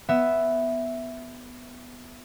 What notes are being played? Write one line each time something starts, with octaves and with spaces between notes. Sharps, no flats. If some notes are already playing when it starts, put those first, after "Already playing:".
B3 E5